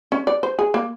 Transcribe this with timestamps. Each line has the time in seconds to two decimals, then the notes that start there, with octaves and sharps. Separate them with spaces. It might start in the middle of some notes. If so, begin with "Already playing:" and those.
0.12 C#4
0.27 D5
0.43 C5
0.59 G#4
0.74 A#3